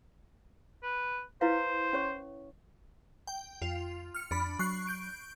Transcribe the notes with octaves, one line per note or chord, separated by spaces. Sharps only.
B4
E4 B4 C5 F5
C#4 C#5 C#6
G5
F2 F4
F6 C#7
F2 D4 B5
F#3 C#6 F#6 C7
G6 D7